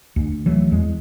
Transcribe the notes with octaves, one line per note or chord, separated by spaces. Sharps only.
D2
E3 F#3 A3
E2 G#3